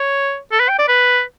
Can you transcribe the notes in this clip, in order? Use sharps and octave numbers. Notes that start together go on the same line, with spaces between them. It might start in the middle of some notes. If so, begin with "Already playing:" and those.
Already playing: C#5
A4
B4
G5
D5
B4